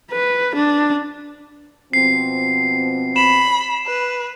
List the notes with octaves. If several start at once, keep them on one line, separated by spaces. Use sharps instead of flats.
B4
D4
B2 F3 C4 C7
B5 E7
B4